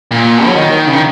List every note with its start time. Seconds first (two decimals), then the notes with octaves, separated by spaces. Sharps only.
0.11 A#2
0.46 F#3
0.55 D#3
0.87 C#3
0.93 D#3